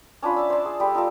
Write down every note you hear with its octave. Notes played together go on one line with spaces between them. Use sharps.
C#4 D4 F4 B5
E5 A5 E6
C5 D5 A5
G#4
G3 A4 B5
D#4 F4 A4